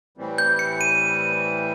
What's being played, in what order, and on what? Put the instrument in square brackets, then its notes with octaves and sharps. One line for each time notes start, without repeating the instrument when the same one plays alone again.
[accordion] A2 E3 G3 C4
[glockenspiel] G6
C#7
D#7